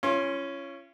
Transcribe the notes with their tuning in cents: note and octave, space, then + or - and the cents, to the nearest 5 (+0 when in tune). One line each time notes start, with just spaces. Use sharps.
C#4 +0 F4 -40 C6 +35